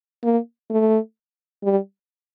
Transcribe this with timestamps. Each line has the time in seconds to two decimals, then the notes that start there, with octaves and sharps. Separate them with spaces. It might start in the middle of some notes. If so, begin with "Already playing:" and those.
0.24 A#3
0.70 A3
1.63 G3